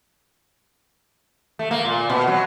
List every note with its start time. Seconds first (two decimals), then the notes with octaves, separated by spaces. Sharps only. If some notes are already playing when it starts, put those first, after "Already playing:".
1.59 A3
1.71 A#3
1.85 A#2
2.10 B2
2.27 F#3